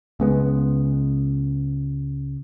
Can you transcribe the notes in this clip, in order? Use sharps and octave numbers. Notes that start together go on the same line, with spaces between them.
C#2 G#3 B3